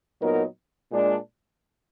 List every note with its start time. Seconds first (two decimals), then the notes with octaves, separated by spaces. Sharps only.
0.19 A#2 F#3 B3 D#4 A#4
0.91 A#2 G#3 D4